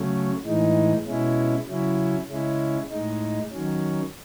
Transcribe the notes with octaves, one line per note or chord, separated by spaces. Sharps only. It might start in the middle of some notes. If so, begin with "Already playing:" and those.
Already playing: C#3 F#3 A3 C#4
A2 E3 G#3 D#4
B2 G#3 C#4 E4
C#3 F#3 C#4 E4
C#3 G#3 C#4 E4
A2 G#3 D#4
D#3 F#3 C#4